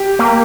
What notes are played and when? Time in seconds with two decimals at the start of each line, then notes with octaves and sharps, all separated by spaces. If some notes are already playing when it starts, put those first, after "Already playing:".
Already playing: G4
0.19 A#3